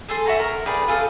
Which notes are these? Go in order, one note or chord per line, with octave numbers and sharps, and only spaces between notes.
G#4 A4 C6
E4 F#4 A#5
A#4
G#4 B4 D5 G5
F4 G#4 A4 D6